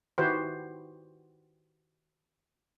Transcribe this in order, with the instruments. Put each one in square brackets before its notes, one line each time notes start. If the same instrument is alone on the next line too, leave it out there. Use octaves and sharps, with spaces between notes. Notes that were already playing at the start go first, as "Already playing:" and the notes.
[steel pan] D#3 E4 F#4 G4 B4 C5